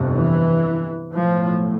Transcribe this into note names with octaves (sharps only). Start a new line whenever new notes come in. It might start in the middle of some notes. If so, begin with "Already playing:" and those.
Already playing: G1 F2 C3
E3
B1 A2 F3